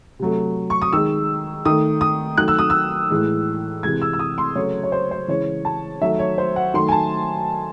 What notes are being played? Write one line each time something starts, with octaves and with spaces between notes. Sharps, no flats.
C3 F#3 A3
C#6
D#6
D#3 G#3 E6
D#3 A3 D#6
D#6
D#3 F#3 A3 F#6
E6
D#6
E6
A2 E3 G#3
C3 E3 G#3 G#6
E6
E6
D#6
C6
C#3 F#3 A3 C#5
C#5
C5
C5
C#3 E3 G#3 C#5
A5
D#3 F#3 A3 E5
C#5
C5
F#5
D#3 F#3 A3 C6
G#5
A5